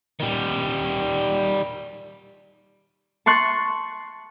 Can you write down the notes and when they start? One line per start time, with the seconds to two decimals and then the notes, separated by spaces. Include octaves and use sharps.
0.20 D#3 G3
3.26 A5 C6 C#6 F#6